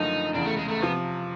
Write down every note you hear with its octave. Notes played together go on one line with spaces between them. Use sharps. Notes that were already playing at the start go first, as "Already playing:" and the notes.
Already playing: F#1 F#2 D3 F3 A3 D#4
F1 E2 C#3 D4
A3
G#3
A3
C3 F3 B3